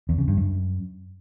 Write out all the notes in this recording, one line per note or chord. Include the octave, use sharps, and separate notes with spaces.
E2
C#3
G2
F#2